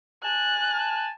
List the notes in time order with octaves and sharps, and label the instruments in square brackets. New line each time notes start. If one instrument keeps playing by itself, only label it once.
[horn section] G#5 A5 [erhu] F#6